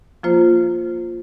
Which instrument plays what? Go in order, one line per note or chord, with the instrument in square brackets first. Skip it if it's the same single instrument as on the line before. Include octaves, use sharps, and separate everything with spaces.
[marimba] F3 A#3 F4 C5